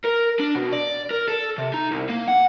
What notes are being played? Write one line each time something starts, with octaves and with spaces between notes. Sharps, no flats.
A#4
D4
B2
D5
A#4
A4
C3
D#4
C2
A#3
F#5